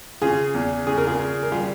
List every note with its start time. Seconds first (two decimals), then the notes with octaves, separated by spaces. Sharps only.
0.22 C#3 F4 G#4
0.54 E2
0.87 C#3 G#4
0.97 A#4
1.07 F4 G#4
1.19 C#3
1.43 A#4
1.52 G3 F4 G#4